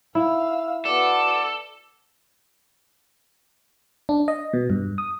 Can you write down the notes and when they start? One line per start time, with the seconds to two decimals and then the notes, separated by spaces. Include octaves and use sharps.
0.15 E4 F5 E6
0.85 B3 F#4 A4 D5
4.09 D4
4.28 D#5
4.53 B2
4.70 G2
4.98 D#6